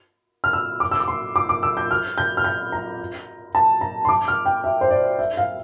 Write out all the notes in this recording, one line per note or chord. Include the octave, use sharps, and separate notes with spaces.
F6
E6
D6
E6
D6
C6
D6
D6
E6
G6
F6
G6
F6
G6
A#5
A5
A#5
C6
D6
F6
G5
E5
C5
D5
E5
F5